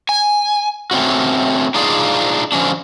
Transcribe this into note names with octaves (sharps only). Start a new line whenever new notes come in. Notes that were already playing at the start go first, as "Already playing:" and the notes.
G#5
A3 C4 C#4 F#4
D4 D#4 F4 G#4 D5 F5
D3 F3 C#4 D4